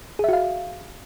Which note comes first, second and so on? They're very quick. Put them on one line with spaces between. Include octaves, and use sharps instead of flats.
G#4 E5 F#4 F5